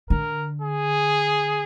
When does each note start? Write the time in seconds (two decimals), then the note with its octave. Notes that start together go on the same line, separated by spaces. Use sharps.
0.10 D3 A#4
0.61 G#4